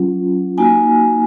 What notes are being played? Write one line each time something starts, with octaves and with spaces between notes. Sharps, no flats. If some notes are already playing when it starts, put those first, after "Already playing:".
Already playing: F#3 C#4 F4
A#3 D#4 F#4 G#5